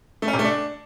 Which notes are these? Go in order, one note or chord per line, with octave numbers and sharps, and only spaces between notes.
A3
C#4
C3
A3
D4